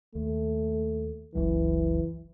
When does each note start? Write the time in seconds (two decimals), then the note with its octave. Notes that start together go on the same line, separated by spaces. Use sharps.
0.15 D#2 A3
1.35 F#1 C#2 E3 F#3